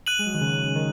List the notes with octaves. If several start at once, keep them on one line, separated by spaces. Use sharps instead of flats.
F#6 D#7 F#7
G#3
F#3
D#3
C#3
D#3